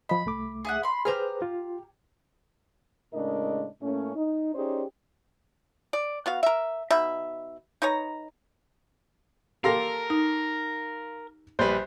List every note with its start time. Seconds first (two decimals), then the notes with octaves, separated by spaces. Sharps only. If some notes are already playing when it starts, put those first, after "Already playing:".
0.09 F3 D#5 B5
0.26 C2 A3 D6
0.65 G#4 E5 F#5
0.83 B5 C6
1.05 G4 G#4 B4 C5 A#5 F6
1.42 F4
3.13 A2 C#3 G#3 D4 A#4 D#5
3.81 A2 A3 A#3 C#4
4.16 D#4
4.55 C#4 D#4 G4 G#4 C5 D5
5.93 D5
6.26 B3 F#4 F5
6.43 A#4 E5
6.90 B2 D#4 E5 B5
7.82 D#4 B4 C#5 A#5
9.64 A#3 G4 A4 A#4 F5 C6 A#6
10.10 D#4
11.59 A#1 G3 B4 C5